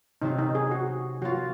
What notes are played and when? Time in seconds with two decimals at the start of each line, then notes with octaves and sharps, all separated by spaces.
0.22 C3 F#3 C4 D#4 F4
0.38 D#4
0.55 G#4
0.71 F#4
1.22 F#3 A#3 F4 F#4